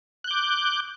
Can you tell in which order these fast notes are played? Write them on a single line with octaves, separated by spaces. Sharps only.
F#6 G6 D6